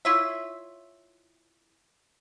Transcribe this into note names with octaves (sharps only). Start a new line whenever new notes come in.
E4 F4 C#5 E5